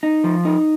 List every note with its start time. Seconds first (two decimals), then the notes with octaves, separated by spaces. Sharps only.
0.03 D#4
0.24 F3
0.45 D#4